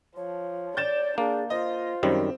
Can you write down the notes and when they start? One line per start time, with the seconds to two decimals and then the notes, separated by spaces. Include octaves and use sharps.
0.16 F3 C#5
0.77 D5 G6 A6 E7
1.18 A#3 D4 G#4
1.50 F4 C5 D#5
2.03 F#2 D#3 G3 C4